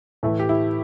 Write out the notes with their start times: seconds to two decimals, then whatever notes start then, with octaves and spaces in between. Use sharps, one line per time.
0.23 A2 E3 A3
0.39 G4
0.49 E4